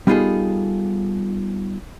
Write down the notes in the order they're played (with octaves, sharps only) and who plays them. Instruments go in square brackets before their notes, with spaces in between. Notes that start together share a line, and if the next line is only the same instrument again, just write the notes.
[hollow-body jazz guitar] G3 B3 D#4 F4 G#4 A4